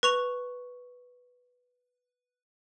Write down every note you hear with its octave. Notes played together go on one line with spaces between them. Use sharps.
B4 C#6 F7